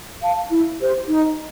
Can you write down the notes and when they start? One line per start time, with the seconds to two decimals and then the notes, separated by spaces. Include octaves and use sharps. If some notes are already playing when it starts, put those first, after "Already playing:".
0.21 F5 A5
0.50 E4
0.80 G4 C5
1.09 D#4